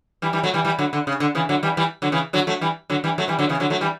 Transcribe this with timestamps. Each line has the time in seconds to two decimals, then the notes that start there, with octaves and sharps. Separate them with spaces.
0.22 E3 G3
0.33 E3 G3
0.43 F#3 A3
0.54 E3 G3
0.65 E3 G3
0.79 D3 F#3
0.93 D3
1.07 C#3
1.20 D3
1.35 C#3 E3
1.49 D3 F#3
1.63 E3 G3
1.77 E3 G3
2.02 D3 F#3
2.12 C#3 E3
2.33 D3 F#3
2.47 F#3 A3
2.61 E3 G3
2.90 D3 F#3
3.04 E3 G3
3.18 F#3 A3
3.28 E3 G3
3.39 D3 F#3
3.49 C#3 E3
3.60 D3 F#3
3.70 F#3 A3
3.81 E3 G3